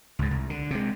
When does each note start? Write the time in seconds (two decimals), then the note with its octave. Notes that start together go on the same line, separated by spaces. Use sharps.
0.19 C#2 G#2
0.31 C2
0.50 D3
0.71 C3 G#3